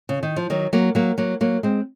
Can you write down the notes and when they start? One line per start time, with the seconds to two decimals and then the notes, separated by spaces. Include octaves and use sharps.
0.09 C#3
0.23 D#3
0.36 F3
0.50 D#3 F#3
0.73 F#3 A#3
0.95 F#3 A#3
1.18 F#3 A#3
1.41 F#3 A#3
1.63 G#3 C4